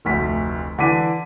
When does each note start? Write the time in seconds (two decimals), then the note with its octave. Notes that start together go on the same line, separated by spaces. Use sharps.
0.05 F1 D2 B6
0.78 D3 E3 D6 B6 D#7